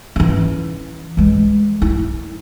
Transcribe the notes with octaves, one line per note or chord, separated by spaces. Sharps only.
E3 C#4
E3 G#3
E4